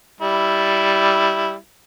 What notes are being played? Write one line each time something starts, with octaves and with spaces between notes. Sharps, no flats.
G3 E4